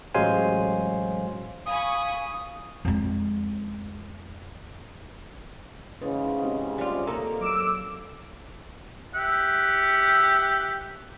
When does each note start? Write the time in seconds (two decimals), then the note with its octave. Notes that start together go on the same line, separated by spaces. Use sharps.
0.14 A1 F#3 G#3 C5 F5 G#5
1.66 F5 G#5 B5 C#6 D#6
2.85 F2 G#3
6.02 E2 G#2 C#3 B4
6.44 C4 D#4 G4
6.78 G3 F4 G4 C5 D5
7.07 A#3 D#4 A4
7.41 F#3 D6 E6
9.15 G4 E5 F#5